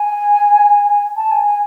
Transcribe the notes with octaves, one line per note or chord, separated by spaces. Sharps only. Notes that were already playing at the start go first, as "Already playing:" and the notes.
Already playing: G#5
A5
G#5
G#5